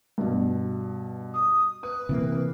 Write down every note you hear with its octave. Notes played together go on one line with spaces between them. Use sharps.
G2 B2
D#6
B4 D#6
C3 E3 A#3